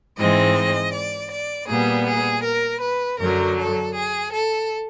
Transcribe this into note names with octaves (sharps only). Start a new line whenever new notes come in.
G#2 E3 G#3 C4 D#5
D5
D5
A#2 G3 B3 G#4
G#4
A#4
B4
F#2 D3 F#3 A#4
A4
G#4
A4